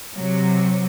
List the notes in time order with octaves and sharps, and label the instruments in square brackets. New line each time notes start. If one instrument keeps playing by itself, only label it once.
[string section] C3 F#3